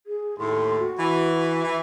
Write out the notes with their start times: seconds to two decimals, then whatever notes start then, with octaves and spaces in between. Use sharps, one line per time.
0.07 G#4
0.39 D#2 A2 C6
0.78 F#4
0.99 E3
1.64 E3